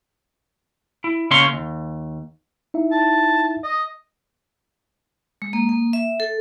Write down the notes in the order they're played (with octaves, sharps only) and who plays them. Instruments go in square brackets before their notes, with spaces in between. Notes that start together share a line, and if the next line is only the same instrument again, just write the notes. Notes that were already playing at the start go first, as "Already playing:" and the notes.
[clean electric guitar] E4
C#3 A#3 C#4 C#5 F5 C6
D#2
[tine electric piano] D#4 E4 E5
[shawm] A5
D#5
[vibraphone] G#3
A#3
A#3
E5
A4